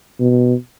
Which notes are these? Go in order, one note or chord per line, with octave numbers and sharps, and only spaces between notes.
B2